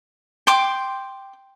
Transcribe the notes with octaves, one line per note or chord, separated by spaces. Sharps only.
G5 C6 D6